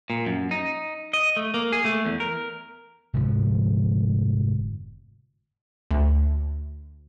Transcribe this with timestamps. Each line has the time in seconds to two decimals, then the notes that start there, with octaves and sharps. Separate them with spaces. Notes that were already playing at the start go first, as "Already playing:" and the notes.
0.10 A#2
0.26 F#2
0.51 D#4
1.13 D#5
1.37 A3
1.54 A#3
1.72 G#4
1.85 A3
2.05 E2
2.20 A#4
3.14 F1 G#2 D3 F3
5.91 D2